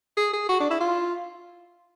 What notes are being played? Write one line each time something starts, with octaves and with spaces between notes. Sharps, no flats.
G#4
G#4
F#4
D4
E4
F4